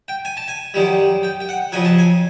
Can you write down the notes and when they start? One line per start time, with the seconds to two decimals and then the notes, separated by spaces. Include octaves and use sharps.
0.08 G5
0.25 G#5
0.37 A5
0.48 G#5
0.74 F#2 D#3 G3
1.23 G5
1.40 G5
1.49 F#5
1.72 F2 C#3 F#3 G#5
1.85 A5
1.99 G#5